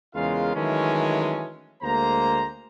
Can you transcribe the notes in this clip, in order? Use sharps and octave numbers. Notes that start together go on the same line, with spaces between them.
E2 C#3 G#3 F4 A#4 F5
D#3 E3 F#3 G#3 A3 C#4
D2 G#3 A#3 C5 A#5